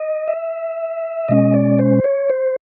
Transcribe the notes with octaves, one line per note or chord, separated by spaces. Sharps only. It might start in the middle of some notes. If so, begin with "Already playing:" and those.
Already playing: D#5
E5
B2 G#3 C#4 D#5
D5
C5
C#5
C5